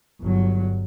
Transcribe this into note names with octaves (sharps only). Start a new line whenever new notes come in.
G1 F#3